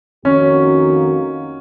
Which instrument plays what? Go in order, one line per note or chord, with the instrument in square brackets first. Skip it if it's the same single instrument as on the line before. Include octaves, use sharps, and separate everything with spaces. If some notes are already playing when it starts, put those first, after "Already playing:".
[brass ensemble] F2 D#3 A#3 D#4 F#4 [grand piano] C#4